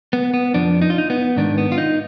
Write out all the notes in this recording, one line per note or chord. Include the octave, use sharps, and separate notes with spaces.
B3
B3
F2 F3 D4
D#4
F4
D#4
B3
G#2 D#3 D4
B3
F4
D#4